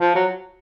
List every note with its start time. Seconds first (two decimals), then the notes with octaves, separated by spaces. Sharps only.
0.01 F3
0.15 F#3